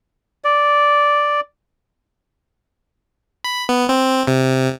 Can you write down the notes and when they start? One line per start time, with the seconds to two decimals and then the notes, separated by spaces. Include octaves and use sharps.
0.44 D5
3.44 B5
3.69 B3
3.89 C4
4.27 C3